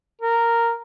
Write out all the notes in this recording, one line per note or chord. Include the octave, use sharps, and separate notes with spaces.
A#4